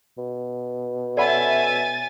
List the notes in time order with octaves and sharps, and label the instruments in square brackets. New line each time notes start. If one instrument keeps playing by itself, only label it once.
[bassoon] B2
[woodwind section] C#4 A4 E5 [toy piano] D5 F#5 B5 [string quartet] G#5 A6